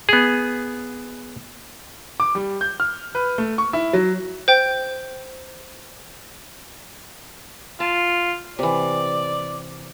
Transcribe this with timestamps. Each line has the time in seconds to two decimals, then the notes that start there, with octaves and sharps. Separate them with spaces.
0.09 B3 G#4
2.20 D6
2.35 G3
2.61 G6
2.80 F6
3.15 B4
3.38 A3
3.58 C#6
3.73 E4
3.93 F#3
4.48 C5 G5
7.80 F4 A5
8.59 C3 E3 D5